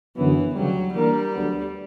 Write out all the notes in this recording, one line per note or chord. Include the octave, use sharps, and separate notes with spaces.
F#2 D3 E3 F#3 B3
D2 C#3 F#3 G3
E3 G3 A#3 D4 A#4
D2 D3 F#3 B3